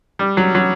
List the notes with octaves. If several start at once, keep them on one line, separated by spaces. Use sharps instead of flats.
G3
F#3
F#3